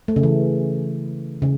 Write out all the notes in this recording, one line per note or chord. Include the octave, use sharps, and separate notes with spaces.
A3
C#3
E3
C#3